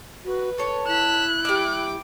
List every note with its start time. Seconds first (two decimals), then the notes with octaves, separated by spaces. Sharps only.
0.25 F#4 B4
0.58 A4 C#5 C#6
0.87 E4 F#6 B6 E7
1.45 G3 E5 G5 D6